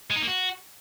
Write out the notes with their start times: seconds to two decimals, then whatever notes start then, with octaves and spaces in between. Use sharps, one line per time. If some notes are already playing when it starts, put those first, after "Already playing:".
0.11 G#3
0.16 D#4
0.22 A#3
0.28 F#4